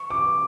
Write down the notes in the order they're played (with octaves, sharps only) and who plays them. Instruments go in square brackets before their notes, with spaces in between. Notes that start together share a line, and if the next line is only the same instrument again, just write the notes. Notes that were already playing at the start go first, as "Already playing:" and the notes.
Already playing: [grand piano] C#6
D6